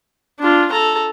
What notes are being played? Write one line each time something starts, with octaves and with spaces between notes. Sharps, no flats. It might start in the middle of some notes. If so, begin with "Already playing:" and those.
D4 F4
A4 A#5